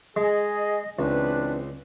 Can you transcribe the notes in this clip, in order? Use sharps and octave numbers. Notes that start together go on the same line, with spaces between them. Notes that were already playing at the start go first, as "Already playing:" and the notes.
G#3 G#4 D#5
C#2 E3 C4 D4 B4